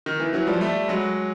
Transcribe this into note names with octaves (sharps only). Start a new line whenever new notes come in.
D#3
E3
E3 F#3
F3 G3
G3 A3
F#3 G#3